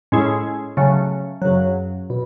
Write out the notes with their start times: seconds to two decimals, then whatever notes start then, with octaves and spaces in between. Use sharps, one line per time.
0.12 A2 G#3 C#4 E4 G#4
0.77 C#3 F#3 A3 C#4
1.42 F#2 C#3 F#3
2.10 B2